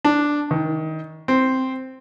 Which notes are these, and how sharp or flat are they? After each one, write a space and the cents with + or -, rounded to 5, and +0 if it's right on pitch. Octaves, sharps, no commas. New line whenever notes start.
D4 +0
D#3 +25
C4 +0